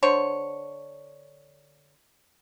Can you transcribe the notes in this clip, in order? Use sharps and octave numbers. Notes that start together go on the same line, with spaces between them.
D3 C5 C#5